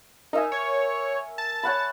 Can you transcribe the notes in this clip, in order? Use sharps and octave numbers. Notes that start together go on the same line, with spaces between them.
D#4 A#4 E5 G#5
C#5
A5
C#5 F#5 B5